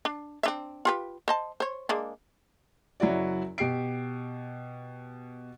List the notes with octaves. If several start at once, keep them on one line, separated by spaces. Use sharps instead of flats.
D4
C4 D4 E5
F4 G4 B4
C5 D#5 A5
C5 C#5
G#3 A#3 D4
F#1 F#3 E4 F#4 D5
B2 G4 C7 D7